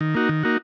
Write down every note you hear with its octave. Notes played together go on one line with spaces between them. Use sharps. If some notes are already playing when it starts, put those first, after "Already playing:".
D#3
A#3 D#4 F#4
D#3
A#3 D#4 F#4